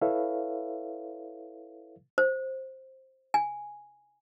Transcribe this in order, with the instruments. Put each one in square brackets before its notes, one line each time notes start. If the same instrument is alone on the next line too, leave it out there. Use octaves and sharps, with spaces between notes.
[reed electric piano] E4 A4 B4 C#5 E5 F5
[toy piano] C5
G#5